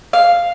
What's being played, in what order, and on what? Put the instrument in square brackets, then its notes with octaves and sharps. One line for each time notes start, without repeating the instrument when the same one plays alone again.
[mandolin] F5